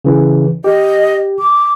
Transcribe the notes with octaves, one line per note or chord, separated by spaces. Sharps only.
C#3 E3
G4 D#5
D6